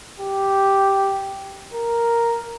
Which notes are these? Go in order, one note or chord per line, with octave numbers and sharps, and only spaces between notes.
G4
A#4